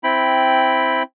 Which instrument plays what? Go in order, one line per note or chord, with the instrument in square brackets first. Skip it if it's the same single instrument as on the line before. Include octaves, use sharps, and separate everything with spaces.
[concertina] C4 E4 G5 B5